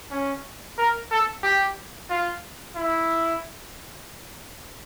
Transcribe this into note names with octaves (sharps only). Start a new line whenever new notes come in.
C#4
A#4
A4
G4
F4
E4